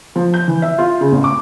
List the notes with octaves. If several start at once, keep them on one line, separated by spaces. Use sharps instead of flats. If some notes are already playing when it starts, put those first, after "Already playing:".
F3
G6
E3
E5
F4
C#3
A1
D6